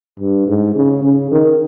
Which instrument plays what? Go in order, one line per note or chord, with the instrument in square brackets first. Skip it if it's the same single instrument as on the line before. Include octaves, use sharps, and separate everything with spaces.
[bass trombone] G2
G#2
C#3
C#3
D#3